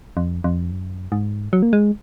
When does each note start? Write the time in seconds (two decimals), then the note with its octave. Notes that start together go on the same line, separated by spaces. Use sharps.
0.17 F2
0.44 F2
0.71 F#2
1.12 G#2
1.53 F#3
1.63 A#3
1.73 G#3